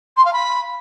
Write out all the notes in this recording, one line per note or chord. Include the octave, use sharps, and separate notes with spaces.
C6
F5
B5